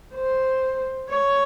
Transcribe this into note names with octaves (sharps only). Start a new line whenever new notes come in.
C5
C#5